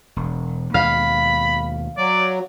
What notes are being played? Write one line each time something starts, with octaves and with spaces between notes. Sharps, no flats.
E1
D#2 B2 G#3 F5 B5
F#3 D5